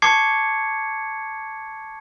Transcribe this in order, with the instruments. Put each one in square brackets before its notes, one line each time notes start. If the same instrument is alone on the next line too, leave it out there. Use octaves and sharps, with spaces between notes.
[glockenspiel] A5 C#6 D6 G#6 C7 C#7